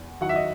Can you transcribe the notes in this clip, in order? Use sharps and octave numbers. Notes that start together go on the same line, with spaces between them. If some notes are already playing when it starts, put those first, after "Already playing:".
Already playing: E2
D#3 F#3 F#5
E5
D#5